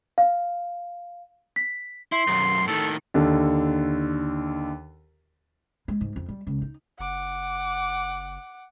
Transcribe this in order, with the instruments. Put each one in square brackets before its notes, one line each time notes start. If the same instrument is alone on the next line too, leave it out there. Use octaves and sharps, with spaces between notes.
[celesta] F5
B6
[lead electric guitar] E4 [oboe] C6
[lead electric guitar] B1 F#2
[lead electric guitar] A2 D#3 [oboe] A4
[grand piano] D#2 D3 A4
[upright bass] G#3
G#2
F2
G3
C#2
D#4
[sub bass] F#1 [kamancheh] F#5 D6